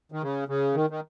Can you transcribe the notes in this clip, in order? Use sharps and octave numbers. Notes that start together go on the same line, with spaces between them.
D#3
C#3
C#3
D#3
D#3